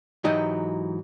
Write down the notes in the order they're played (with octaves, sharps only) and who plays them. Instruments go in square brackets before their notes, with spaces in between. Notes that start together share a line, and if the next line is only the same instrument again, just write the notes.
[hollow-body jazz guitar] G#2 E3 F#3 D#4 G4